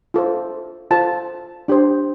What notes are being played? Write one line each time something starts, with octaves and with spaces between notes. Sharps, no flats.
F4 A4 C5
F4 A4 C5 A5
D4 G4 C5